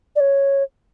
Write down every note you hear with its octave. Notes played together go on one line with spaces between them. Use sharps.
D5
C#5